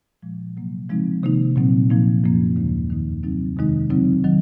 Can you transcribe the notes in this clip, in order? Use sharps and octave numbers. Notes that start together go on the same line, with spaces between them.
A#2 F3 G#3
C3 F#3 A#3
C#3 F3 G#3 C4 D#4
C3 D#3 A#3 D#4
A#2 F#3 C4
A#2 F3 A#3 D#4
F#2 F3 A#3 C#4
D#2 C#3 G#3 D#4
F2 D#3 A#3 D#4
C3 F#3 C4 D#4
F2 C3 D#3 G#3 D#4
C#3 F#3 C4 D#4
D#3 F#3